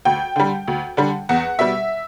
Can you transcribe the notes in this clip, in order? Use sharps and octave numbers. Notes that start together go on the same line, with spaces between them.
D2 G5
D3 G3
D2
D3 G3
E2 F#5
B2 G3 E5